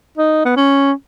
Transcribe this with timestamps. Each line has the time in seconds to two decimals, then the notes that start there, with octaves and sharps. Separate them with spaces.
0.17 D#4
0.45 B3
0.56 C#4